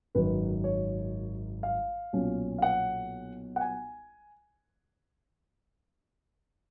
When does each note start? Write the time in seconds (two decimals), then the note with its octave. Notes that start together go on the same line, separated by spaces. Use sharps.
0.15 G#1 F#2 D#3 F#3 B4
0.64 C#5
1.63 F5
2.13 B1 A#2 F#3 C#4
2.58 F5
2.62 F#5
3.56 F#5
3.61 G#5